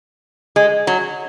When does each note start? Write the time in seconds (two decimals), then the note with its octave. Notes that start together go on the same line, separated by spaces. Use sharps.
0.56 G#3
0.87 F#3